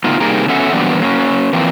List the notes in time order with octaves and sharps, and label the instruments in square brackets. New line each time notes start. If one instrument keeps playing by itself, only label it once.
[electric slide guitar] A2 D3 A3 B3 D#4 F4
C3 G3 A#3 D#4 G#4 A#4
F#3 B3 C#4 A4 E5 F#5
E3 F#3 G3 A#3 B3 D4
F#3 A#3 C#4
E3 F3 A#3 C4